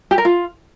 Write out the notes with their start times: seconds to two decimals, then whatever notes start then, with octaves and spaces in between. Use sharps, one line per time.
0.11 G4
0.18 A#4
0.25 F4